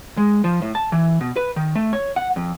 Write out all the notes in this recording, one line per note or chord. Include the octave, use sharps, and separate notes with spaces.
G#3
F3
A2
A5
E3
B2
B4
D#3
A3
C#5
F#5
F2